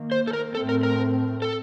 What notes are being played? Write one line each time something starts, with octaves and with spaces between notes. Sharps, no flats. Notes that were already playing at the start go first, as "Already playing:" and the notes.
Already playing: D#3 A#3
C5
A4
A#4
A2 A3 C4 A4
A#4
A#4
A4